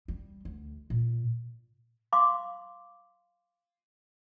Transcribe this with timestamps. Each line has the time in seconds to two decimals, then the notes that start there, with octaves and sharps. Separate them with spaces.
0.08 G3
0.45 D2
0.90 A#2
2.13 F5 C6 D6